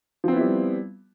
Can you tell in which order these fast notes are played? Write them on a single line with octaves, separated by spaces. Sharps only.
F3 C4 B3 E4 G3